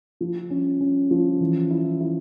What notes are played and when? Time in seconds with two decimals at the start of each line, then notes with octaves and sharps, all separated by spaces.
0.21 F3
0.50 C#4
0.81 C#4
1.11 F3
1.40 E3
1.71 E4
2.01 E4